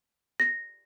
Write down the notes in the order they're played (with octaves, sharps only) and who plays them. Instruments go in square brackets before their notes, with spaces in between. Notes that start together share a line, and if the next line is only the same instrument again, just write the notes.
[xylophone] A#6